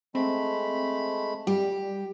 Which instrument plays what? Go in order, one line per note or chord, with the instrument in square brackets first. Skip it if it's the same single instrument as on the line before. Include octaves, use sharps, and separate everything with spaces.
[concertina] G#3 A3 B5 [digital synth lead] C4
[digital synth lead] G3 [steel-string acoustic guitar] G4